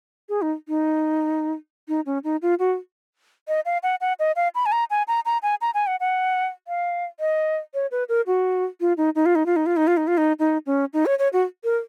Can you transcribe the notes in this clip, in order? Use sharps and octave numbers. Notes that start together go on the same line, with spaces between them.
G#4
D#4
D#4
D#4
C#4
D#4
F4
F#4
D#5
F5
F#5
F#5
D#5
F5
B5
G#5
A#5
G#5
A#5
A#5
G#5
A#5
G#5
F#5
F#5
F5
D#5
C#5
B4
A#4
F#4
F4
D#4
D#4
F4
D#4
F4
D#4
F4
D#4
F4
D#4
F4
D#4
D#4
C#4
D#4
C#5
C#5
F#4
A#4